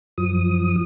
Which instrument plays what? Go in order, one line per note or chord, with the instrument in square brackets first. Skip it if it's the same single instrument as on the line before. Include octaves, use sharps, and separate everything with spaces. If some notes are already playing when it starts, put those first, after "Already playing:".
[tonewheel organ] F#2 F3 D#6